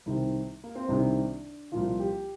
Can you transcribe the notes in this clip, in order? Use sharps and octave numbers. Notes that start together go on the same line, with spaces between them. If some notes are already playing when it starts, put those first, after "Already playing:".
C2 C3 D#3
A#3
C4
C2 C3 D#3 D4
C2 A#2 F3 F4
G4